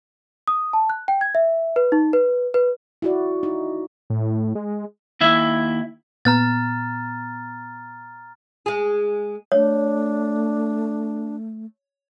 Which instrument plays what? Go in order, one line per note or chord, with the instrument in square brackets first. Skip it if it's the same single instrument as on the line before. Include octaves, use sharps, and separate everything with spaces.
[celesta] D#6
A5
F#6
G5
G#6
E5
B4
D#4
B4
B4
[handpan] E4 F#4 D5
D#4
[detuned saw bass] A2
G#3
[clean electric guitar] D#2 E4 E5
[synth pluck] A#2 B3 [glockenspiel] A#5 F6 A6
[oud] G#3 G#4
[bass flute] A3 [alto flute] D4 [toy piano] C#5